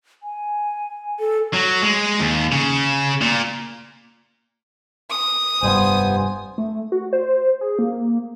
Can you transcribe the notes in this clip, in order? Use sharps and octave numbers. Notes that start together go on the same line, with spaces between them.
G#5
A4
F#3
G#3
D#2
C#3
A#2
D#6
F1 G2 G3 B3 C5 G#5
A3
F#4
C5
G#4
A#3